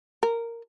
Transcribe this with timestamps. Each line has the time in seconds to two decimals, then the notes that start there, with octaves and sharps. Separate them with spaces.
0.23 A#4